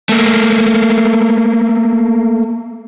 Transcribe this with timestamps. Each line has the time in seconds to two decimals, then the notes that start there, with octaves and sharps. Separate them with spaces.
0.09 A3 A#3